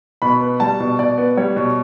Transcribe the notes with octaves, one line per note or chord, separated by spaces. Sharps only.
B2 B5
B3
G3 A5
B2
B2 D5
B3
G3 C#5
B2